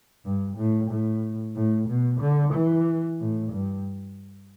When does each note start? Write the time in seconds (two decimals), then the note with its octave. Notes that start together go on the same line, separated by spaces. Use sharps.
0.24 G2
0.57 A2
0.90 A2
1.55 A2
1.88 B2
2.21 D3
2.53 E3
3.20 A2
3.53 G2